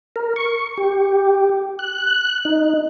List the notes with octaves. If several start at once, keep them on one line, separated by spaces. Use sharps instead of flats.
A#4
C#6
G4
F#6
D#4